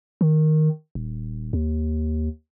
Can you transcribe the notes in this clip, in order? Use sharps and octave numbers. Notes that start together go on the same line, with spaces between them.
D#3
D#1
D#2